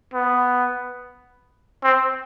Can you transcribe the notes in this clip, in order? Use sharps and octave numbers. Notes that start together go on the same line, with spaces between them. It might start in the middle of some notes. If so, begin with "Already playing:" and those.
B3
C4